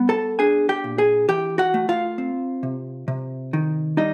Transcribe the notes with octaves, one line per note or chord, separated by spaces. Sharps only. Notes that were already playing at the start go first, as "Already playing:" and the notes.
Already playing: G3 B3
A4 A5
D4 G#4 G#5
G4 G5
A#2
G#4 G#5
E3 G4 G5
F#4 F#5
A3
F4 F5
C4
C3
C3
D#3
G3 D#4 D#5